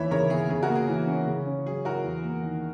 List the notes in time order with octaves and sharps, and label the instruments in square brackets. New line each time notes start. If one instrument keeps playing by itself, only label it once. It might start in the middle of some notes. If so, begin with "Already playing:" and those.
Already playing: [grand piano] D#2 E3 [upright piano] C#5 E5 B5
[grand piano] C#3 [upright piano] A#4 C#5
[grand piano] B3 [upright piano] G#4
[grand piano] C#3 [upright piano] G#4
[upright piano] F#4 A#4
[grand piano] A#3
[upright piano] G#4
[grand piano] E3
C#4
C#3
C#4
[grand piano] F#3 [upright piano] G#4
[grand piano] E4 [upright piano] F#4 A#4
[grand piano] E2
A#3
D#3